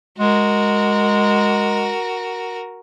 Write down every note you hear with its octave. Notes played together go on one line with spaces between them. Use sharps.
G#3 F#4 A#4